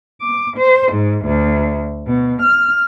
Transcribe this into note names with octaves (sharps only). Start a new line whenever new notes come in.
D6
C5
G#2
D2
B2
F6